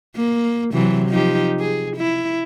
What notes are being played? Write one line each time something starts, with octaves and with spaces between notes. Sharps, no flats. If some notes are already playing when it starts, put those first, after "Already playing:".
A#3
C3 E3 F#3
F3 D#4 G4
G#4
E4